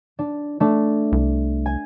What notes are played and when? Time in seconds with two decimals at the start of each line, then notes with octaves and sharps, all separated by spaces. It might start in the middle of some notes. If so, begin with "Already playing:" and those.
0.19 D4
0.60 A3 D4
1.12 C2
1.66 G#5